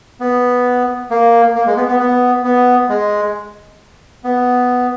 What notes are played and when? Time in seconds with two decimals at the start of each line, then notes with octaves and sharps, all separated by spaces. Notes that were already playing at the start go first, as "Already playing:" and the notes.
0.20 B3
1.10 A#3
1.55 A#3
1.66 G#3
1.77 B3
1.88 B3
2.00 B3
2.44 B3
2.89 G#3
4.24 B3